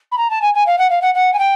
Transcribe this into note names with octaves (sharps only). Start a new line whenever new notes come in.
B5
A#5
A5
G#5
G#5
F5
F#5
F5
F#5
F#5
G#5
G5